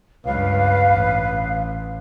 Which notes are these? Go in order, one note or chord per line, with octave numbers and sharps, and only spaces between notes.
C#2 G2 B4 F5
A1